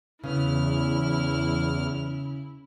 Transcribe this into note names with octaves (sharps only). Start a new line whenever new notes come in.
E2 C#3 B3 E4 F6